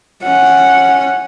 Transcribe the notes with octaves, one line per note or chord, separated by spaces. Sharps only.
C#4 F#5